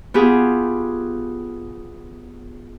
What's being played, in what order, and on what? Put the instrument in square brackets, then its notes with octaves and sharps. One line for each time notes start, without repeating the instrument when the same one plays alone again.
[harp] B3 F4 G4 G#4